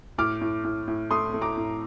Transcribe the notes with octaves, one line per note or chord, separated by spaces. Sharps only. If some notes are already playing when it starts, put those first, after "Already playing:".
A2 D6 F6
A2
A2
A2
A3 C6 D#6
A3
A#5 D6
A2